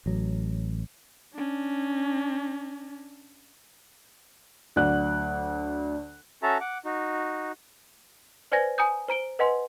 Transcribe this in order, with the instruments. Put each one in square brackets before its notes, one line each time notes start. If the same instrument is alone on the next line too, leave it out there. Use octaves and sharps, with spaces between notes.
[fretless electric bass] A1 F#3
[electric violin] C#4 D4
[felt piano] D2 F#3 D5 F#5 F#6
[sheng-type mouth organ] C#4 F#4 A4 E5 A5 A#5
F#5 D6
D#4 F#4
[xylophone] B4 C5 D5 G#5 G#6 A#6
G#5 A#5 D#6 G6
C5 A#5 D7 G7
B4 D#5 F#5 G#5 C6